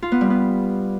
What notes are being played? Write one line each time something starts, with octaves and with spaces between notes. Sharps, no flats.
F4
B3
G3
B3